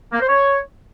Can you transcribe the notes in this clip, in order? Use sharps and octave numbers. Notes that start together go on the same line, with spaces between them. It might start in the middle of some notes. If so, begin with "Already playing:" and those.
A#3
C5
C#5